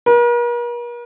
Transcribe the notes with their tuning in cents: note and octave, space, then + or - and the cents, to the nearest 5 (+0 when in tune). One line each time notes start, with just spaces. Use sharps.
A#4 +45